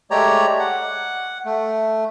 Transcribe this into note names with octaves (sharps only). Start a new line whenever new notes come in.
G#3 A3 G4 C#5 D5 A#5
F#5
A3